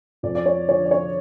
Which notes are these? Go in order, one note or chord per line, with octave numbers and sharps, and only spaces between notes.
F2 D5
D5
C#5
D3 F3 C#5
D5
C#5